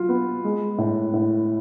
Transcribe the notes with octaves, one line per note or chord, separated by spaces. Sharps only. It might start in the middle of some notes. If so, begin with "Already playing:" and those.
Already playing: F#3 F4
B3
G#3
A2
A2